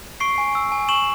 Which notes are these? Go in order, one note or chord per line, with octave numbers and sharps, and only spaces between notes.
C#6 C7 D7
G#5
E6
G#5
C#6 E7 F#7